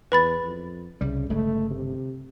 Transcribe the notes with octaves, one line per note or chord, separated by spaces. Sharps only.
E2 B4 B5 A6
F2
C2 C#3 G3
G1 C#3 G#3 A3
C3